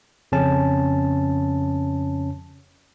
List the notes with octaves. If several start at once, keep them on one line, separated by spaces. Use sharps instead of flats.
F2 C#3 C#4 A5